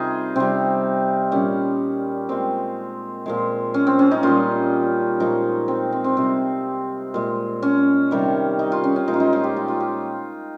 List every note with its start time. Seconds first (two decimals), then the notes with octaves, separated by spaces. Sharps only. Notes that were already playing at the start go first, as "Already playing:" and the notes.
Already playing: C3 G3 D#4 F4 G#4 A#4
0.36 C3 G3 C4
1.31 A#2 G3 C#4
2.29 A#2 G#3 C4
3.26 A#2 F3 G#3
3.74 C#4
3.87 C4
3.99 C#4
4.11 D#4
4.23 A#2 G3 F4
5.20 A#2 F3 G#3 D#4
5.68 C4
5.92 C4
6.04 C4
6.17 C3 G3 C4
7.14 A#2 G#3
7.62 C#4
8.11 C3 D#3 G3
8.59 D#4
8.72 F4
8.84 C#4
8.96 C#4
9.08 A#2 F3 G#3 D#4
9.14 F4
9.20 D#4
9.33 F4
9.44 G4
9.56 F4
9.68 F4
9.80 G4